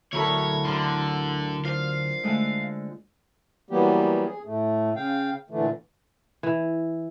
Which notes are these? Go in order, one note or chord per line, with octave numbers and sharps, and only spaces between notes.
D2 F#3 E4 A4 A#4 C#5 B5
D3 A#4 C6
D4 F4 C5 F5
D3 G#3 A3
E3 F#3 G3 A#3 B3 G4
G#4
A2 A3
C#3 F5 G5
A#2 D3 E3 A3
E3